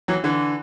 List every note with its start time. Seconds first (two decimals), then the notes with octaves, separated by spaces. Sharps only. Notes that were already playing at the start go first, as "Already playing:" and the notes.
0.08 E3 F#3
0.24 D3 E3